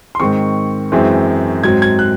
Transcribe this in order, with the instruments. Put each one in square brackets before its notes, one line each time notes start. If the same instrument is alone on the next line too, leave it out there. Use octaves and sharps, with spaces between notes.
[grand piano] C6
G#2 D#3 G#3 C4 C#6
F#2 E3 G#3 C4
G#2 F#3 C4 G#6
G#6
F#6